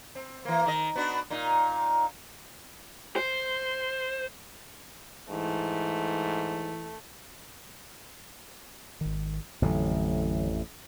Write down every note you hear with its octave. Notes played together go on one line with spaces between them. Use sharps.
C4
E3 A#3
D#3 D#5
B3 D4 F#4
A#2 D#4
C5
G#2 E3 A3
G#1 D#3
A1 F2 A2 D3 F#3